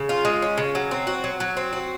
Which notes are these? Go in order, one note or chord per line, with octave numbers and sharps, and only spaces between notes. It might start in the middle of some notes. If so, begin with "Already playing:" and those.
Already playing: C#3
F4
G#3
C#4
C#3
F#3
C4
F#4
F#3
F#3
C4
F#4